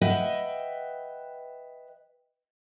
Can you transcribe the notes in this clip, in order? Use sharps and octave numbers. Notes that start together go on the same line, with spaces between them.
B4 D#5 E5 F#5 G5